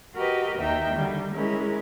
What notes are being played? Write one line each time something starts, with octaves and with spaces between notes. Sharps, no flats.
F#4 G4 A#4 B4 D#5
D#2 D#4 E5 G5
D3 D#3 G3
G#3 C#4 E4 A#4